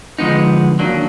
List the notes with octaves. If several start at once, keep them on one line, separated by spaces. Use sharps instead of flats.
D3 F3 G#3 B3 D#4
D#3 F#3 A#3 D4